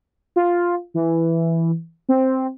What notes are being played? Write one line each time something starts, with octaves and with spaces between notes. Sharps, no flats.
F4
E3
C4